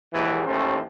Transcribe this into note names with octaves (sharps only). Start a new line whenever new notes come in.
A#1 D#2 G#2 E3
A1 D#2 A3 C#4 C5